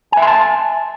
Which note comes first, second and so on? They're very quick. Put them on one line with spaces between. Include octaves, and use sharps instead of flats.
G#5 E5 C6 A5